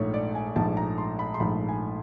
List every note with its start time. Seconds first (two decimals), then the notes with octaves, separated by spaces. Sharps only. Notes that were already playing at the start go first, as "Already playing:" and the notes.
Already playing: A#1 G#2 F3 A3 C#5
0.14 D5
0.35 G#5
0.56 A#1 G#2 F3 A3 A5
0.77 A#5
0.98 C6
1.19 B5
1.34 C6
1.40 A#1 G#2 F3 A3 B5
1.69 G#5